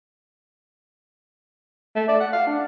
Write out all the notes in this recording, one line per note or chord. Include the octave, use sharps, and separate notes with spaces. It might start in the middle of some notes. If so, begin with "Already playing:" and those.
A3
D5
F#5
F5
D4